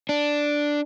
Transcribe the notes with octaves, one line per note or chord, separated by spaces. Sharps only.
D4